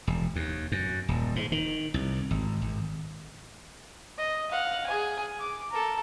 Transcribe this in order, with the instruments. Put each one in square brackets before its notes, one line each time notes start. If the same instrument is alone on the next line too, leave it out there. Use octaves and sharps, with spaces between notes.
[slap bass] E1
D#2
F#2
D#1
G#2
D#3
C2
G#1
G#1
[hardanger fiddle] D#5
F5 F#5
G#4 G#5
D6
A4 A#4